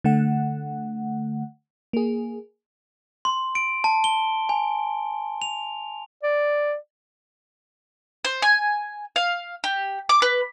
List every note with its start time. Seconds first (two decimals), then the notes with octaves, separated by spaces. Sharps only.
0.04 D3 A3 F#5
1.93 A#3 G#4
3.25 C6
3.55 D7
3.84 A5
4.04 G7
4.49 G#5
5.42 F7
6.23 D5
8.25 C5
8.42 G#5
9.16 F5
9.64 G4
10.09 D6
10.22 B4